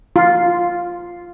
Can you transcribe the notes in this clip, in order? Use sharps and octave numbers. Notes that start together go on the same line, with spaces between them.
F4